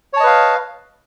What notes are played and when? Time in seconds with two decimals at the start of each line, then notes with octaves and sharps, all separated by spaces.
0.13 C#5
0.17 A5
0.20 D#5
0.23 B4
0.26 F5